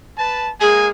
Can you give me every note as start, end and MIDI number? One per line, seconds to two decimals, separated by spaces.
0.18 0.51 71
0.18 0.51 81
0.61 0.89 56
0.61 0.89 58
0.61 0.89 68
0.61 0.89 80